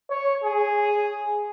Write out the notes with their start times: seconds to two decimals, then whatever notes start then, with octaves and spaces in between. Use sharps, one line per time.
0.10 C#5
0.44 G#4